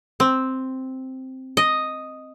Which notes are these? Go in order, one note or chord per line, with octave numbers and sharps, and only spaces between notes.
C4
D#5